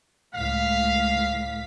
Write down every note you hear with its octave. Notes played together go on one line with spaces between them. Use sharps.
C#2 A2 F5 B6